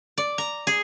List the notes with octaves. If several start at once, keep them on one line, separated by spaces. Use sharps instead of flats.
D5
A#5
G#4